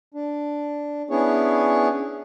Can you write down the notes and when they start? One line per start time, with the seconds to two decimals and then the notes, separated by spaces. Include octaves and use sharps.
0.14 D4
1.10 B3 C#4 D4 E4 G#4 C#5